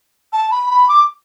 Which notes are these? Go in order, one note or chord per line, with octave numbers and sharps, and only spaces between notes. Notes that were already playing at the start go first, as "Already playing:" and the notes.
A5
B5
B5
D6